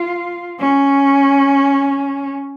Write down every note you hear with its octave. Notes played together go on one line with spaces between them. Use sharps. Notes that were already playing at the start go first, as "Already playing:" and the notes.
Already playing: F4
C#4